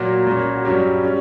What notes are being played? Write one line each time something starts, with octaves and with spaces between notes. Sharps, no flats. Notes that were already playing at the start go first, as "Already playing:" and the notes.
Already playing: A#2 F#3 A#3 F#4
A#2 A#3 C#4
F#4
G2 F#3 G3 C#4 G4
G3 C#4